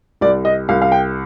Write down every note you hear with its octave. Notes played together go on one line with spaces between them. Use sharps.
C2 D5
D#5
C2 F5
F5
G5